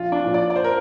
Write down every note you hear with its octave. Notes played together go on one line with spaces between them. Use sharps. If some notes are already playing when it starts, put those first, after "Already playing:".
Already playing: A#1 F4
D4
A#2 F3
D5
D5
C5
A#4